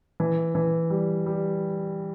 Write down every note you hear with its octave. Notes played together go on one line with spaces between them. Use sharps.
E3
E3
G3
G3